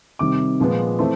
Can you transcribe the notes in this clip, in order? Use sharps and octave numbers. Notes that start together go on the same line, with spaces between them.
C3 D#3 G3 D6
A#2 F3 G#3 B3
E3 A3 C4